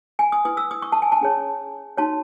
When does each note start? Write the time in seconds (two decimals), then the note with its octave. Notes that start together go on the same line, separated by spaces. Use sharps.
0.19 G#5
0.32 D#6
0.45 E4 B4 D#6
0.57 E6
0.71 D#6
0.82 C#6
0.92 A5
1.02 G#5
1.12 A5
1.21 C#4 G#4 C#5
1.97 D#4 F#4 C#5 A5